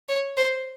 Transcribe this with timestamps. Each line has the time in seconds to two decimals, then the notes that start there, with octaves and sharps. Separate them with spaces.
0.08 C#5
0.37 C5